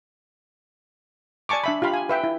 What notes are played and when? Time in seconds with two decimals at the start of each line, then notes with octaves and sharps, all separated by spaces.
1.49 D5 G#5 A5 C#6 D6
1.64 D4 E5 B5
1.82 F4 G4 F5 B5
1.94 G#5
2.09 B4 E5 G5
2.24 E4